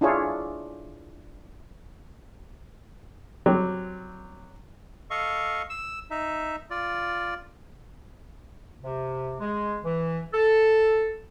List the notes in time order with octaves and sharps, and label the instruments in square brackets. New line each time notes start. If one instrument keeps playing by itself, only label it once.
[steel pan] D4 E4 F4 G#4 C#5
[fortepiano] F#3 G3 C4
[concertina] A4 D#5 F5 C#6
E6
D#4 E5
F4 D5
[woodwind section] C3
G#3
E3
A4